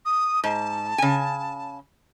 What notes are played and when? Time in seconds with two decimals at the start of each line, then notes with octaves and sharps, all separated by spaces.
0.05 D#6
0.44 G#2 A5
0.98 C#3 G#5